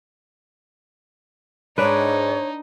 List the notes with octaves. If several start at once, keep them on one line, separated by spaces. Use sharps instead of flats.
G#2 D4 D#4 B4 C#5